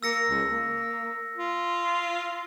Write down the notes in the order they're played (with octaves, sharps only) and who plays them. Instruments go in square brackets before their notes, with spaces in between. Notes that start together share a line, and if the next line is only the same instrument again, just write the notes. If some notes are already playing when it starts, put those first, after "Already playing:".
[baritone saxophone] A#3 [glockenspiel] E6 A#6 C#7
[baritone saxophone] C#2
A#3
F4